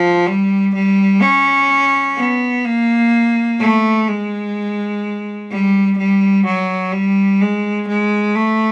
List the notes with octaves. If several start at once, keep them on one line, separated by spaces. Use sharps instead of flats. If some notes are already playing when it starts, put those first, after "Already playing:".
Already playing: F3
G3
G3
C#4
B3
A#3
A3
G#3
G3
G3
F#3
G3
G#3
G#3
A3